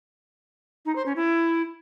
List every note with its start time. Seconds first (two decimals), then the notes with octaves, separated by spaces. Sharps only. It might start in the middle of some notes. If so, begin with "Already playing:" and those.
0.86 D#4
0.96 C5
1.06 C#4
1.16 E4